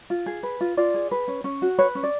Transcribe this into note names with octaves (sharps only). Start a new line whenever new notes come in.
F4
G#4
B4
F4
F4 D5
G#4
B4
C#4
C#4
F#4
B4 C#5
C#4
D5